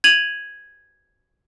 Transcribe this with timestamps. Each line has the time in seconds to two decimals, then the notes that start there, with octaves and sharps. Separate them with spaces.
0.04 G#6 D#7 F7 F#7